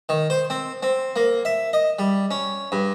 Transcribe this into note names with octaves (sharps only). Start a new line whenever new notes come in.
D#3
C5
C4
C4
A#3
E5
D#5
G3
C#4
G2